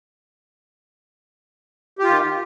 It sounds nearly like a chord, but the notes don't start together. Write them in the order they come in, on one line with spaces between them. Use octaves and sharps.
G4 F4 D#3